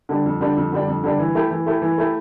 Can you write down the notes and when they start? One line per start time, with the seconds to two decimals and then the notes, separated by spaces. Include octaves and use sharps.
0.09 D3 G3 D4
0.26 F2
0.41 D3 G3 D4
0.57 F2
0.72 D3 G3 D4
0.88 F2
1.03 D3 G3 D4
1.19 E3
1.35 A3 E4 G4
1.50 E3
1.66 A3 E4 G4
1.82 E3
1.98 A3 E4 G4